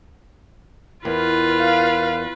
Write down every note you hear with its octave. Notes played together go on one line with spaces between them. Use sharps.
E2 F4 A#4 B4
F5